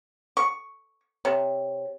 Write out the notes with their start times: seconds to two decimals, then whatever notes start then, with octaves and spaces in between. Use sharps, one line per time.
0.37 C#6
1.25 C3 C#5